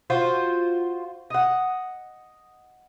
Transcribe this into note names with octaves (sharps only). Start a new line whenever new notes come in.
F4 F#4 C5
D#5 F#5